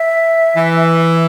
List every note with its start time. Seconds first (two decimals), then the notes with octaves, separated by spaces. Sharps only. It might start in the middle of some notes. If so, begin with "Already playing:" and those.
Already playing: E5
0.56 E3